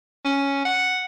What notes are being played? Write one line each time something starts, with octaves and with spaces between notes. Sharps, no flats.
C#4
F#5